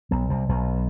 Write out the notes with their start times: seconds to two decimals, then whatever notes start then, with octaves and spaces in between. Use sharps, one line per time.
0.11 B1 B2
0.30 C2 C3
0.49 B1 B2